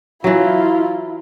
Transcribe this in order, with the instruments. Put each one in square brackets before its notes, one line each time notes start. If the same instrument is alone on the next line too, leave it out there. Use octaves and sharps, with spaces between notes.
[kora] E3 F#3 [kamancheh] E4 F4